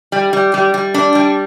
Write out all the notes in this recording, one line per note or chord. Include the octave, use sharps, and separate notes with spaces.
G3
G3
G3
G3
D4
G3